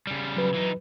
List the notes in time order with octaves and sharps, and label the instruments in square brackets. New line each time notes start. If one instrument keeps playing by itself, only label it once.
[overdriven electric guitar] C#3 G3
[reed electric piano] F#3 B4
[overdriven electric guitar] E3 D#4